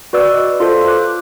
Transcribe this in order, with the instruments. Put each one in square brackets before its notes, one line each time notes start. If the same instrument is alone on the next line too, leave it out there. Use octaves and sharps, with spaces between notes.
[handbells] F#4 B4 D5 E6
D#5
F4 A4 C5
D6 F#6